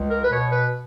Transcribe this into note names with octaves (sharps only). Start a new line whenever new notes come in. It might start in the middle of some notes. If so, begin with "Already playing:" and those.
Already playing: C#2
A#4
B4
B2 C#5
B4